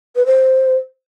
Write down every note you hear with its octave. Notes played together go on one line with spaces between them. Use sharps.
B4
C5